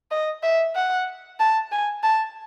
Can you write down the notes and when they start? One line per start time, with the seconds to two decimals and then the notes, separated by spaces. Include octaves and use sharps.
0.11 D#5
0.43 E5
0.75 F#5
1.40 A5
1.72 G#5
2.03 A5